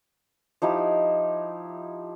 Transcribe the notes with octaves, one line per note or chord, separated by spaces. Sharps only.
F3 D#4 E4 G4